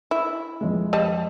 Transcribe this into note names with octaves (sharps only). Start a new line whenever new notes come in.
E4
F2 G#3
G3 D#5 A5